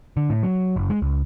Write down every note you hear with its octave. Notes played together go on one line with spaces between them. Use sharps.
D3
A2
F#3
F#1
G#3
C#2